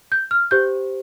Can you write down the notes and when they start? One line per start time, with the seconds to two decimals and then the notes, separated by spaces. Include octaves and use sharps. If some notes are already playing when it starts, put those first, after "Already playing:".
0.12 G6
0.31 F6
0.51 G4 C5 G6